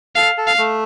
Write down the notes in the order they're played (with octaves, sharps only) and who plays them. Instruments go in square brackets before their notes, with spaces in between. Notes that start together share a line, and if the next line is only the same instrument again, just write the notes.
[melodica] A4 [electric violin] F5
[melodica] A4
[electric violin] F5
[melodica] A3